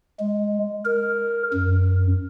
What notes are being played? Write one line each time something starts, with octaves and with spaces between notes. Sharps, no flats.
G#3
A#4
F#2